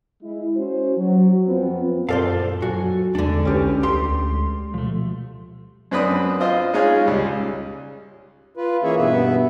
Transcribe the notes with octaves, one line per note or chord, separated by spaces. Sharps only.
G#3 E4
C#4 F#4 C5
F#3
F2 F3 B3 C4
F#2 A#2 F4 A4 C5 D5 F5 A5
F#3 F#4 G#5
E2 D3 G#3 D4 A4 D5
C2 C#4 G4 B4
D2 G4 C6
B2 F3 A3
F#2 C4 D4 B4 B5 D#6
F4 C5 D#5
G#3 C#4 D#4 F4 G#4
C#2 G3
F4 B4
E3 A#3 C#4 G#4 C#5 E5
G2 B2 B3 B4 E5